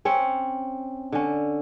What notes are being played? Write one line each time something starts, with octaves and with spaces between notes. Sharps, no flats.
C4 C#4 C#5
D3 C#4